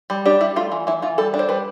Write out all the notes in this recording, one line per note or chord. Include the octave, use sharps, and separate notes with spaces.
G3
D4 G4
G3 E4
A3 F4
E3
E3 E4
E3 F4
G3 A4
D4
C5
G3 B4